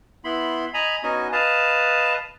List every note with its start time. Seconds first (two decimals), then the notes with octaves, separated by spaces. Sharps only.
0.24 B3 E4 B5 C6
0.74 D#5 G#5 A#5 B5
1.03 B3 C#4 D#4 F#4 D#5 G#5
1.32 B4 D#5 F5 A5